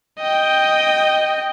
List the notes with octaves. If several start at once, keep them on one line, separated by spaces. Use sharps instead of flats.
D#5 G5